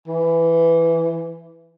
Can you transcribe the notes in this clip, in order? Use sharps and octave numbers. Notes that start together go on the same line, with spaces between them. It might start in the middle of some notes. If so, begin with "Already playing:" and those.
E3